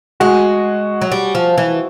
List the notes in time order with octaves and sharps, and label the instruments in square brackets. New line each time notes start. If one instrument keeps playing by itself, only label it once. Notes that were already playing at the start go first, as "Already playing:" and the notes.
[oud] G#3 [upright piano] F#4 G#4
[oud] F#3
G3
F3
E3